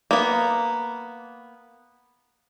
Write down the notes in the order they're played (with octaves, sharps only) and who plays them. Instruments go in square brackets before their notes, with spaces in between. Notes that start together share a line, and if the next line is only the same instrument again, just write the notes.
[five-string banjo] A#3 B3